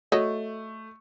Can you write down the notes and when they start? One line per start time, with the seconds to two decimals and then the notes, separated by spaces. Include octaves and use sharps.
0.12 A3 F#4 C#5 D#5